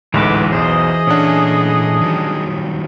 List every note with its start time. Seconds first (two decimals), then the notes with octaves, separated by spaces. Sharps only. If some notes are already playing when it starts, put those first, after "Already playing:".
0.14 A1 D2 G#2 E3 G#3 A3 B4 D6
0.52 B1 E2 G#4 C5 D#5
1.07 A#2 A3 C#4 D4 F#5
2.01 D#3 F#3 G3